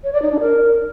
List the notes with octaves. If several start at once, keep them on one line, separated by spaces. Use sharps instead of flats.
C#5
D5
D#4
D4
A#4